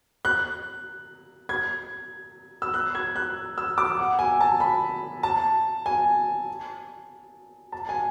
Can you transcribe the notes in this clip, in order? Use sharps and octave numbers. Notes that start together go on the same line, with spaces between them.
F#6
G#6
E6
F#6
G#6
F#6
E6
D6
F#5
G#5
A5
B5
A5
G#5
A5
G#5